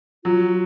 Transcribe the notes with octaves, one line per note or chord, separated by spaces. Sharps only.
F#3 F4